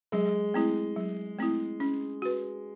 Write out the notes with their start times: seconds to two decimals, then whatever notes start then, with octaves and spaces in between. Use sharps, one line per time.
0.12 F#3 G#3
0.54 A3 C4 E4
0.96 F#3
1.39 A3 C4 E4
1.80 C#4
2.22 F#4 B4